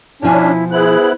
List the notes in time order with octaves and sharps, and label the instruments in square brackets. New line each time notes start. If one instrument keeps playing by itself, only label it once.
[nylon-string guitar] B2 F3 G#5 [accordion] C#4 D4 [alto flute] E4
[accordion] B3 E4 F#6 [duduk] G#4 [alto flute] C5